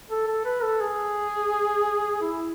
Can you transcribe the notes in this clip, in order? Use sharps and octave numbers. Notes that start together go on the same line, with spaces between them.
A4
A4
B4
A4
G#4
E4